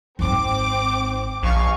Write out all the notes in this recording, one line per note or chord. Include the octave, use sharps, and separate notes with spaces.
G#1 G#2 C4 D6
A#1 F5 G#5 C#6